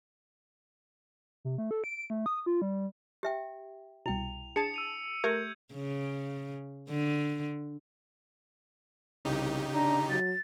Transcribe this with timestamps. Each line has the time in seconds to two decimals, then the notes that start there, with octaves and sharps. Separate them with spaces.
1.45 C3
1.58 A3
1.71 A4
1.84 D7
2.10 A3
2.26 D#6
2.46 F4
2.62 G3
3.23 G4 E5 G5
4.06 C2 B2 E4 G5 F7
4.56 D4 G#4 A5 C#7
4.74 E6 D#7 F7
5.24 A3 G4 A#4 G6 G#6 C#7
5.73 C#3
6.89 D3
9.25 C2 C#3 D#4 G4
9.74 D4 A#5
10.10 F#3 A6